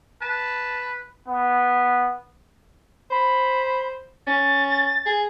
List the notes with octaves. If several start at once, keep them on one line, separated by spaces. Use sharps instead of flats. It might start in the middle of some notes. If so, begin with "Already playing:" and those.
B4 A5
B3
C5 B5
C#4 A6
G#4